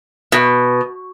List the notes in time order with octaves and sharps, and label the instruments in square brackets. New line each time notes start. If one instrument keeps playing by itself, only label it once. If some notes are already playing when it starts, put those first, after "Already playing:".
[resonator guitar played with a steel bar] B2